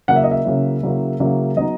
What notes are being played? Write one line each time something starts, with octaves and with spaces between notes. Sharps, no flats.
C#3 F#3 A#3 E4 F#5
E5
D#5
E5
C#3 F#3 A#3 E4
C#3 F#3 A#3 E4
C#3 F#3 A#3 E4
F#3 B3 D#4 D#5